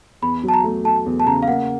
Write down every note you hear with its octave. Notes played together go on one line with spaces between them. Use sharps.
E2 B5
F#3
A5
A#5
A3
A3 A5
E2
A5
C#3 A#5
F5
A#3 F#5